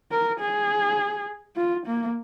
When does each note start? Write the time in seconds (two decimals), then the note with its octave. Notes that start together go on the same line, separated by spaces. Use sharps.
0.11 A#4
0.40 G#4
1.56 F4
1.87 A#3